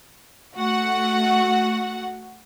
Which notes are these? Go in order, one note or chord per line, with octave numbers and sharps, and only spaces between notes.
A3 F#4 F#5